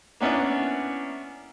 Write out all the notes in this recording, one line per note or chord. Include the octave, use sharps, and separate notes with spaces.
A#3 B3 C#4 D4 E4